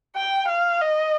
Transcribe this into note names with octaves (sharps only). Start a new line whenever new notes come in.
G5
F5
D#5